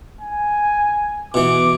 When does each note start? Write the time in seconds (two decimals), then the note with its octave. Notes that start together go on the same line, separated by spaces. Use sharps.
0.21 G#5
1.34 B2 E3 D6